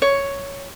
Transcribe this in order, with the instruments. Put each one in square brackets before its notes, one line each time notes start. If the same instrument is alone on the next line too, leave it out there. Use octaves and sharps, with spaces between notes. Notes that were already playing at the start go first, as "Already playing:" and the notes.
[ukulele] C#5